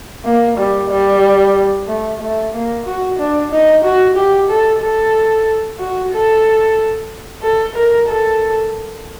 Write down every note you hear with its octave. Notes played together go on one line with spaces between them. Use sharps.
A#3
G3
G3
A3
A3
A#3
F#4
D4
D#4
F#4
G4
A4
A4
F#4
A4
A4
A#4
A4